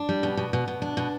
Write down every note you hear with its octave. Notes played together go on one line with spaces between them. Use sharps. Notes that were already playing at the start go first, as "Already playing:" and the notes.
Already playing: D4
G3
B2
B2
B2
B2
D4
B2